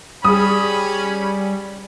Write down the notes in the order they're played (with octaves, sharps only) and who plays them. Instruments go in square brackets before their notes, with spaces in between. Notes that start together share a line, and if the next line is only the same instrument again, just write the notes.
[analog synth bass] G3 [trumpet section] C#4 B5 [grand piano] G#4 D#6